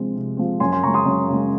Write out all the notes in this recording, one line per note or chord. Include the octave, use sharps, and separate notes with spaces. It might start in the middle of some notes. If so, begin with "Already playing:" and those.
Already playing: C3 F3 G#3 C4
C3
F3 G#3 C4
F#2 G#5 C6
G#5 C6
C#3 G#3 A#5 C#6
C6 D#6
F#2
C#3 G#3